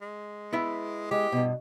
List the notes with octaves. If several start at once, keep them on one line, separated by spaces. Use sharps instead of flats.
G#3
B3 E4 E5
G#3 G4
G2 B2